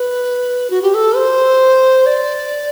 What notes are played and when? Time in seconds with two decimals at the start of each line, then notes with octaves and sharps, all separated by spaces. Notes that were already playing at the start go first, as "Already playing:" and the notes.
Already playing: B4
0.70 F#4
0.82 G4
0.94 A4
1.16 C5
2.06 D5